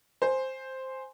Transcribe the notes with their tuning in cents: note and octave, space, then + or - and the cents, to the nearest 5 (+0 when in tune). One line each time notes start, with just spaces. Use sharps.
C5 +0 G#5 +0